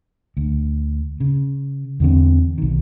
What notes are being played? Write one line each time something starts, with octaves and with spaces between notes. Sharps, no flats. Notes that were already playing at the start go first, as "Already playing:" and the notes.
D2
C#3
E2 D3 C4
B1 D#3